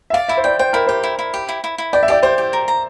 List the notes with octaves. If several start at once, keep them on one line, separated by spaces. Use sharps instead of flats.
E5
D5 F5
E4 E5
C5
D5 G5
C5 G5
E4 A#4
G4 C5
E4
E4
G4
E4
E4
E4
D5 G5
E5
G4 D5
G4 C5
G4
A#4
A#5